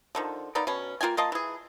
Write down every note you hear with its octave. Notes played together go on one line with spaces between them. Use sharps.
D3 D#3 F3
A#3 B3 D#4 D5
B2 C#4
A#3 F4 G5 G#5
A#3 F4 D#5 A5
E3 G#4